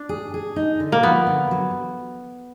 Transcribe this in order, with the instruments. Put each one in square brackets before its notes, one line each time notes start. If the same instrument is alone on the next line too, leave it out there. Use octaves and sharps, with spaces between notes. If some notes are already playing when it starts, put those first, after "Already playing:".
Already playing: [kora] D4
[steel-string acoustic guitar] G#4
G#4
D#4
D3
[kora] A#3
[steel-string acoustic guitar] F3 [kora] B3
[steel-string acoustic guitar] D3
F#3